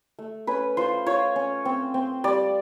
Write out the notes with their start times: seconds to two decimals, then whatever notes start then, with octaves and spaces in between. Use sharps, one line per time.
0.19 A3
0.47 C#4 B4
0.77 F4 C5
1.06 F4 C#5
1.36 C#4
1.65 C4
1.94 C4
2.24 G3 D5